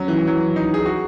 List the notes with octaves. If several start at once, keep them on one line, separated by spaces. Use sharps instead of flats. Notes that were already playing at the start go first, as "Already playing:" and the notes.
Already playing: F#3 C#4
E3
F#3
D#4
G#4
F#4